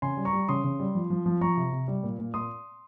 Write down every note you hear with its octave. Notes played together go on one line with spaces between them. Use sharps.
C#3 G#5 C6
G3
A#5 C#6
G3
C#3 C6 D#6
C#3
G3
F3
F3
F3
F3 A#5 C#6
C3
C3
G3
A#2
A#2
A#2 C6 D#6